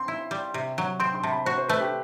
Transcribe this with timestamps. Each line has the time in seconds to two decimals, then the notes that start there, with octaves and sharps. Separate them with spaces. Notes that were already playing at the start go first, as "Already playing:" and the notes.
Already playing: C4 C6
0.08 E4
0.31 G3
0.54 C3
0.78 F#3
1.00 C4 C6
1.15 C6
1.23 C3 A5
1.31 B5
1.46 F#4 C5
1.58 C5
1.69 A3 B4
1.81 G4